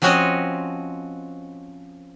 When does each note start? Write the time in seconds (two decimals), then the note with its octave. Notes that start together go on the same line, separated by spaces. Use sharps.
0.02 F3 C4 C#4 F#4 C#5 D#5